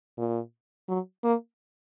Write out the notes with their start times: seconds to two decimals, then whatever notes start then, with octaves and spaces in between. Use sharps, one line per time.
0.18 A#2
0.88 F#3
1.24 A#3